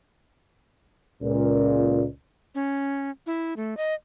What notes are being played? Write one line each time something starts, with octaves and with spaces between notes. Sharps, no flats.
C#2 A#2
C#4
E4
A3
D#5